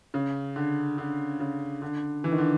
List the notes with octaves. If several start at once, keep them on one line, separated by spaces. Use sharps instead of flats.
C#3
D3
D3
C#3
D3
E3
D#3
D3